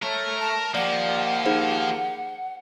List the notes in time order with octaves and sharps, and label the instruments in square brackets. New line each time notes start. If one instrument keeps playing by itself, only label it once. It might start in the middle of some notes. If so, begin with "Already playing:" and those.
[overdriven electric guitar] A3 [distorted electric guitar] A#4 [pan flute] C#5
[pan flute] A5
[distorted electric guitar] F3 [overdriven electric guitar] A#3 G4 [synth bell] D5 [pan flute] F#5
[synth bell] D#4 G#4 C5